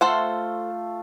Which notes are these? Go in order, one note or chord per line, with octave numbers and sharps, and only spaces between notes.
A3 F4 A4 C5 F#5